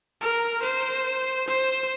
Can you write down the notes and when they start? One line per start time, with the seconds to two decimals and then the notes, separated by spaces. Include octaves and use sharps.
0.21 A#4
0.63 C5
1.48 C5